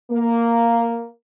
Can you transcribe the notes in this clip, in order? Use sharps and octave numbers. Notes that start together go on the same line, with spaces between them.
A#3